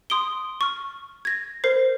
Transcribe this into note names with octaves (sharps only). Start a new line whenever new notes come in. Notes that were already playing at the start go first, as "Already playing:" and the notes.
C6 D#6 D7 G7
C#6 F6
G#6 A#6
A#4 C5 C7